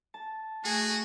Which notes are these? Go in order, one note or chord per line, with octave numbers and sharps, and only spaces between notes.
A5
A3 F#4 G#4